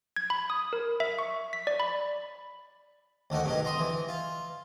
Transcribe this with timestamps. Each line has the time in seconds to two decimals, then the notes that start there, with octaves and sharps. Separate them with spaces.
0.16 G#6
0.30 B5
0.50 D#6
0.73 A#4
1.00 E5
1.19 C#6
1.53 B6
1.67 D5
1.80 B5
3.30 D2 D3 D#3 F#5
3.44 G2 B2 D#4
3.65 A#5 C6 D#6
3.79 E3
4.09 F4